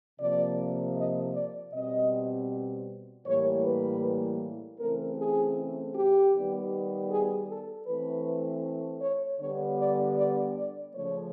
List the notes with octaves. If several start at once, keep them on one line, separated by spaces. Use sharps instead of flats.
C3 F3 A#3 D5
D#5
D5
B2 G3 C4 D#5
A2 E3 G3 A#3 C#5
B4
C#3 E3 A3 C4 A#4
G#4
G4
D#3 G3 B3
G#4
A4
E3 A3 C4 B4
C#5
D3 G3 B3 C#5
D5
D5
D5
C#3 F3 A3 C#5